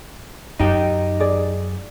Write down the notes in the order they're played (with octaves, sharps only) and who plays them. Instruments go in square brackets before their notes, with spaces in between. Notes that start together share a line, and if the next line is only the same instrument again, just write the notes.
[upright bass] F#2 [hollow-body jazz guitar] D#4 G4
[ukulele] G#4 D5